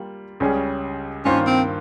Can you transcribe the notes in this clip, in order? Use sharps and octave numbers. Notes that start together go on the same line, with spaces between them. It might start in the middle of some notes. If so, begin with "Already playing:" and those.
Already playing: G3 A#3 F4
C#2 C#3 G3 C#4 G#4
G2 D#3 A#3 C#4 F4 C5
C4